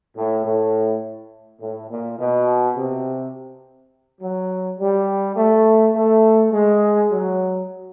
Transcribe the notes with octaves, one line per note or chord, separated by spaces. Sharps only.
A2
A2
A2
A#2
B2
C3
F#3
G3
A3
A3
G#3
F#3